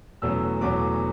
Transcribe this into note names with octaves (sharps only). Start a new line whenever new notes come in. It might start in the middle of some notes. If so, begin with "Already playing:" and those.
E2 B2 F#3 A3 C#4 E6
E2 B2 F#3 A3 C#4 D6